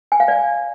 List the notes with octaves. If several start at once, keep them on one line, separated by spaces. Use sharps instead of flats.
G#5
F5
D5